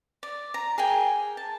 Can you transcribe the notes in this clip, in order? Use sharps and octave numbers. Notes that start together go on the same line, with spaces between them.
D5
A#5
G#4 A#4 G5 G#5
A5